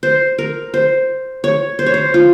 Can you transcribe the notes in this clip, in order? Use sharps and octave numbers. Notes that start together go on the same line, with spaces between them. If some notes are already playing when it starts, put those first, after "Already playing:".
C5
A#4
C5
C#5
C5
C#5
C5
F4